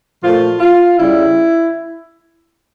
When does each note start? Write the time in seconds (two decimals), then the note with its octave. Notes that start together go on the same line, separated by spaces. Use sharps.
0.22 A#2 F3 A3 F4
0.60 F4
0.99 C#3 G3 E4